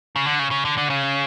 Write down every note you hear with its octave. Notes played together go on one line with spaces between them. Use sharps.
C#3
D3
C#3
C#3
D3
D3
C#3